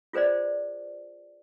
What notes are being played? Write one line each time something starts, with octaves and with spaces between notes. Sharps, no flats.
F4 G#4 B4 C5 D5